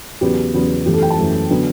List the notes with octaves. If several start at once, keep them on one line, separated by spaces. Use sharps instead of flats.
E2 C#3 F#3 B3 G4
E2 C#3 F#3 B3
F#2 E3 A3 G4
A4
G5
A5
F#2 E3 A3
D3 F#3 B3